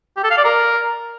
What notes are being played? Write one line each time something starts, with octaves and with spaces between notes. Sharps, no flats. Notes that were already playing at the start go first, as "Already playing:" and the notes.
G4
A4
F5
D5
A#4